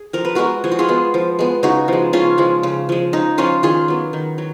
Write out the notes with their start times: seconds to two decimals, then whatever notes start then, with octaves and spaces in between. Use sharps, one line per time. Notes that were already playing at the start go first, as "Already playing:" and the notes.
Already playing: G#4
0.13 F3 A#4
0.25 B4
0.35 G#3 B3 F#4 A#4
0.64 F3 G#4
0.72 F#4
0.79 F4 G#4
0.88 G#3 B3
1.14 F3
1.39 G#3 B3
1.63 C#3 D#4 F#4
1.88 F3 G#3
2.13 C#3 C#4 F4
2.38 F3 G#3
2.63 C#3
2.89 F3 G#3
3.13 C#3 D#4
3.38 F3 G#3 C#4 F4
3.63 D#3 F4 G#4
3.88 F#3 B3
4.13 D#3
4.38 F#3